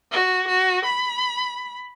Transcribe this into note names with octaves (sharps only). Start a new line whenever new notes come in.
F#4
F#4
B5